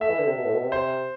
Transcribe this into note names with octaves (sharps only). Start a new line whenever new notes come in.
A3 E5
E3
D3
C3
B2
A2
B2
C3
C5